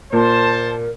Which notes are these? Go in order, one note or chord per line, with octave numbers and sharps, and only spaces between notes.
A#2 A#4 C5 A5